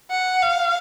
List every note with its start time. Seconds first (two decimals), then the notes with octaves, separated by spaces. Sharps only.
0.10 F#5
0.42 F5